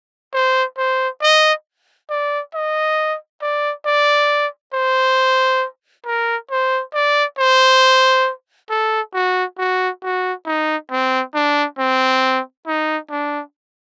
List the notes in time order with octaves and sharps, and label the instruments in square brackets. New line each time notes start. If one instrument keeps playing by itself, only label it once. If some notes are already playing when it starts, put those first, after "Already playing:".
[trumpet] C5
C5
D#5
D5
D#5
D5
D5
C5
A#4
C5
D5
C5
A4
F#4
F#4
F#4
D#4
C4
D4
C4
D#4
D4